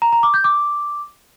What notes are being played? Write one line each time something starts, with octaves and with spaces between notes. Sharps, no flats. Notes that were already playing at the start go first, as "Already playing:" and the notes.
A#5
A#5
D6
G6
D6